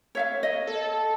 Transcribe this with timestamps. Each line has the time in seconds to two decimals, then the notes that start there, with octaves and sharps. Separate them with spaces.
0.15 C#5 E5 F5
0.43 D#5
0.67 A4